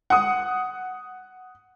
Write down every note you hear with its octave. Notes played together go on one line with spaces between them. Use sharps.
F#5 D#6